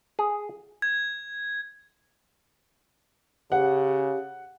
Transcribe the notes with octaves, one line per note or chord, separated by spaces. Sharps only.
G#4
G#6
C#3 G4 F#5